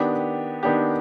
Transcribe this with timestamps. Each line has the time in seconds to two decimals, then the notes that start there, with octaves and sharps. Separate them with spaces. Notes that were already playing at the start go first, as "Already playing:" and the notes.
Already playing: D#3 B3 D4 G4
0.63 D#3 B3 D4 G4